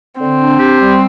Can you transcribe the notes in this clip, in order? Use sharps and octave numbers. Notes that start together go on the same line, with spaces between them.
D3 C4
D4
G4
G3